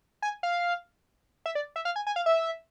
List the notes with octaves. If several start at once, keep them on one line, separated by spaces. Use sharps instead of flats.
G#5
F5
E5
D5
E5
F5
G#5
G#5
F5
E5